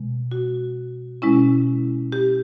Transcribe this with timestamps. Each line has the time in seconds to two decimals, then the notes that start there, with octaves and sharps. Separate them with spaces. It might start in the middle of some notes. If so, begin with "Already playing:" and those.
Already playing: B2 G#3
0.32 F#4
1.22 B2 G#3 C#4 E4
2.12 G4